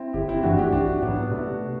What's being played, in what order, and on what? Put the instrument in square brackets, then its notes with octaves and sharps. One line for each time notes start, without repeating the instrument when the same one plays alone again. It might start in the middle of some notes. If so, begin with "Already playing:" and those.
Already playing: [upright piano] C4 E4
[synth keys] G1 [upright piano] E4 G4
[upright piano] C4 E4
[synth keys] G2 E3 A3 [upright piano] D4 F#4
[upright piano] E4 G4
[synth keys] B1 [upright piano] D4 F#4
[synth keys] A2 [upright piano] B3 D4
[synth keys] F#3
[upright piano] B3
[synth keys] C3 [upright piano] A3